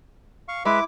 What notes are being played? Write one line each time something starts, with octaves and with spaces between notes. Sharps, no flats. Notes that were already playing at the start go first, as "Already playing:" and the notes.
F5 C#6
G#3 E4 B4 E5 D6